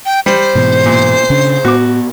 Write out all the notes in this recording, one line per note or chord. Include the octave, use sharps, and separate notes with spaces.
G5
G3 C5
G#2 B2 E3
A#2
C#3 C#4 D4
A2 B3 F#4 D6